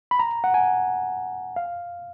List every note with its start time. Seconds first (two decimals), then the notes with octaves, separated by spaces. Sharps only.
0.11 B5
0.19 A#5
0.44 F#5
0.54 G#5
1.56 F5